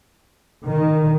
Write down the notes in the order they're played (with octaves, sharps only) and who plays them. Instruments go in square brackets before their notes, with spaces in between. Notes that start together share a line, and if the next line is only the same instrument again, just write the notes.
[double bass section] D#3